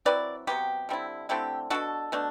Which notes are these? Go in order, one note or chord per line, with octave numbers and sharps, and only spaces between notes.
F#3 C4 E4 B4 D5
C3 F#3 B3 G4
D3 G3 C4 E4
D3 A3 C4 E4 G4
B2 G3 D4 F#4 A4
B2 A3 D4